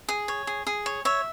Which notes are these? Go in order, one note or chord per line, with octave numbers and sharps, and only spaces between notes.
G#4
C#5
G#4
G#4
C#5
C#5 E5